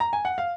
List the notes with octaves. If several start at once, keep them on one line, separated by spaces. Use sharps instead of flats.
A#5
G#5
F#5
F5